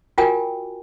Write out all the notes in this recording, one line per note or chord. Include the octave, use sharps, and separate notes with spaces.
F4 F#4 A#4 G5 G#5